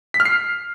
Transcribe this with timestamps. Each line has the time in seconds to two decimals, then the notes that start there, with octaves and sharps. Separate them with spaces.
0.14 B6
0.20 F6
0.25 C7